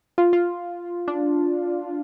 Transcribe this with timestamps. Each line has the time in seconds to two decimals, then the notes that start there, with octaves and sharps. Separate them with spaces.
0.18 F4
0.33 F4
1.08 D4